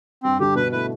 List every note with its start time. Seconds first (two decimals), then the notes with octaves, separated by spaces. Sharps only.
0.23 G2 C4
0.39 D3 G3 D4 G4
0.55 B2 B4
0.72 A3 E4 B4